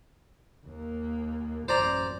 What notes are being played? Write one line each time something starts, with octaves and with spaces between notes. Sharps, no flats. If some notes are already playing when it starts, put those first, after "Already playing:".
D#2 A#3
A1 F#2 C5 D5 A#5